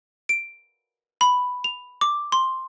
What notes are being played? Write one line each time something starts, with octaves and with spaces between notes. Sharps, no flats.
D7
B5
F7
D6
C6